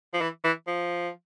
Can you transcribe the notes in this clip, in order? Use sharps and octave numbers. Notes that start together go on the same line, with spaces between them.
F3
E3
E3
F3